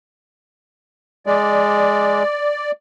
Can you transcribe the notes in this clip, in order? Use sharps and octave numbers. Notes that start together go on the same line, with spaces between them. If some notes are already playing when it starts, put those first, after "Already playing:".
G#3 D5